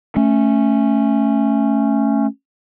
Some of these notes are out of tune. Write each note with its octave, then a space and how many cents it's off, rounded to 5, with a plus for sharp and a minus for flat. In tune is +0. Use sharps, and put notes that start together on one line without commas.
A3 +0 C#4 -5